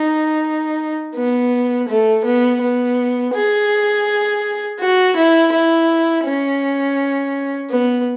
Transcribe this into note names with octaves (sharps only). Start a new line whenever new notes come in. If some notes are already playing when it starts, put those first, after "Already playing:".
Already playing: D#4
B3
A3
B3
B3
G#4
F#4
E4
E4
C#4
B3